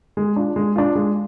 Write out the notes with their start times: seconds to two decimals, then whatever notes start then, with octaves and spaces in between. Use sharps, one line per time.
0.17 G#3
0.36 D4 F4
0.56 G#3
0.76 D4 F4
0.95 G#3